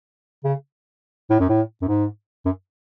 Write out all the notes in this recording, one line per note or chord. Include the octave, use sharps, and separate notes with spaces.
C#3
A2
F#2
A2
F#2
G#2
F#2